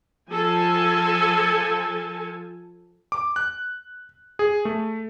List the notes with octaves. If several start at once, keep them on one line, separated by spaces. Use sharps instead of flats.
F3 A4 G#5
D6
F#6
G#4
A3